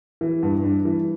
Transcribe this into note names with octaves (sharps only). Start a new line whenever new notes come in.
E3
G2
D4
E3